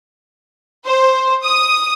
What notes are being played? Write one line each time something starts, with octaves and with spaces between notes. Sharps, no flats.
C5
D#6